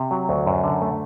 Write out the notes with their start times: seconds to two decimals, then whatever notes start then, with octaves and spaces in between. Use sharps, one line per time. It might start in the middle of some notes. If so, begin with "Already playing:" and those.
Already playing: C3
0.11 F#3
0.29 D2
0.46 F#2
0.64 D3
0.82 A3